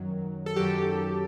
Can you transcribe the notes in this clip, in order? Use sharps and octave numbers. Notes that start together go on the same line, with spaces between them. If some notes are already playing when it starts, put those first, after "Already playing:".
Already playing: F#2 D#3 F#3
A4
F#2 D#3 F#3 G4